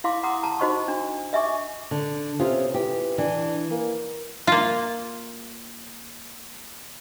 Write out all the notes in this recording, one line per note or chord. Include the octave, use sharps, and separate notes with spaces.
E4 F5 C6 D6
F#5 A#5 C6 D6 D#6
A5 A#5
D#4 F#4 C5 D#5 C6 C#6
D4
D#5 E5 G#5 C#6 D6
D3
C3 B3 C#4 F4
E3 G4
E3 D4
A#3
A#3 F4